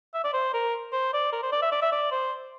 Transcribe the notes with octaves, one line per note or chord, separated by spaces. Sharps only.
E5
D5
C5
A#4
C5
D5
A#4
C5
D5
E5
D5
E5
D5
C5